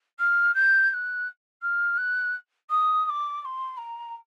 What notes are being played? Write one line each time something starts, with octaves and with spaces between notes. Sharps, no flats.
F6
G6
G6
F#6
F6
F#6
D#6
D#6
D6
D6
C6
A#5